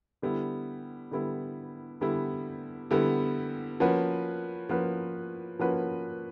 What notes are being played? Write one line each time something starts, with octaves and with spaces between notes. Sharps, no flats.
D3 G3 B3 E4
D3 G3 B3 E4
D3 G3 B3 E4
D3 G3 B3 E4
F3 A#3 C#4 F#4 B4
F3 A#3 C#4 F#4 B4
F3 A#3 C#4 F#4 B4